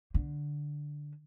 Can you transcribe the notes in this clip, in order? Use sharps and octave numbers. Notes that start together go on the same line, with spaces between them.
D3